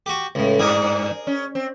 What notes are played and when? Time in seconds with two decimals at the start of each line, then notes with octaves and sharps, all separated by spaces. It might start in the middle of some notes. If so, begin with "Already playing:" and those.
0.06 F#4 G4
0.35 C#2 A2
0.59 G2 G#4 A#4
1.27 C#4
1.55 C4